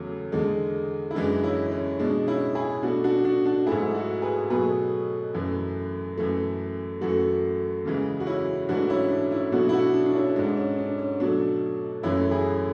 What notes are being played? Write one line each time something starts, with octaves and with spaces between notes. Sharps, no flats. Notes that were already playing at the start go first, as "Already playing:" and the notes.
Already playing: E2 C#3 F#3 A3
E2 D3 G#3
E4
F#2 E3 G#3 D4
C#4 E4
C#4
B2 G#3 D4
C#4 E4
E4 G#4
B2 A3 D4 F#4
D4 F#4
D4 F#4
D4 F#4
G#2 F#3 A3 E4 G#4
F#4 A4
G#4 B4
B2 F#3 A3 G#4 B4
F#2 E3 A3
F#2 E3 A3
F#2 E3 A3 F#4 A4
E2 C#3 E3 G#3
F#4
C#4 E4
G#2 E3 A3 D4 F#4
C#4 E4
D4
C#4 E4
B2 F#3 A3 D4 F#4
E4
D4 F#4
D4
D4
C#4 E4
G#2 G#3 D4
C#4
D4
C#4
B2 F#3 A3 D4
F#2 E3 A3 C#4 E4
E4 G#4